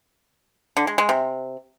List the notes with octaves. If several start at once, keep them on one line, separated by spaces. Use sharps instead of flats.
D3
G#3
G#3
C3